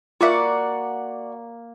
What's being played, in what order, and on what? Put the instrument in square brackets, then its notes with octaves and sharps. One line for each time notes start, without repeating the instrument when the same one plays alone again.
[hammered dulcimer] A#3 [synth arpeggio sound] F4 E5 [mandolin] F#4 D5 F#5